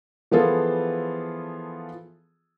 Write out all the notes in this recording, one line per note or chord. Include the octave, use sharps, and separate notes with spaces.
E3 F3 B3 F4 G#4 A4